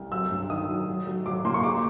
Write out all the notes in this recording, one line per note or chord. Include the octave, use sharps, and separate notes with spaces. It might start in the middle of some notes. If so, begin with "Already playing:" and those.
Already playing: C2
F#3 E6
G2
D#3 D#6
F#3
F#3
F#3
F#3 D6
A#3 C6
C#6
G#3 D6